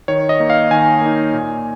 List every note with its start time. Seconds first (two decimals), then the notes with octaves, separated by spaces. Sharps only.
0.08 D#3 C#5
0.29 D#5
0.40 A#3 D#4
0.50 F5
0.71 D#3 G#5
1.01 A#3 D#4
1.33 A#2